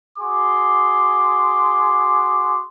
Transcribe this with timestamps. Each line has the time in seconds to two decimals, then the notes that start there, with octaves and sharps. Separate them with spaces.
0.18 F#4 G#4 C6 D6